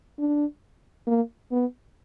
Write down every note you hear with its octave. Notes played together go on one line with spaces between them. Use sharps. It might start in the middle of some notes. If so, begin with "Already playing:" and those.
D4
A#3
B3